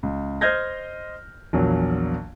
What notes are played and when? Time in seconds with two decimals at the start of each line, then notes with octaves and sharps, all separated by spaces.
0.03 C#2
0.41 C5 D#5 F6 G6 G#6 A#6
1.53 A#1 E2 F#3 A#3